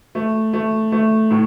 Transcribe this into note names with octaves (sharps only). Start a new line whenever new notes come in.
A3
A3
A3
A2